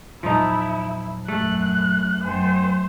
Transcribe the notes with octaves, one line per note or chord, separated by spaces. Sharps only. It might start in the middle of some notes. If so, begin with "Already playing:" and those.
E2 A#2 F3 F#3 D#4 E4
F#2 A3 F#6
F#2 C5 G5 G#5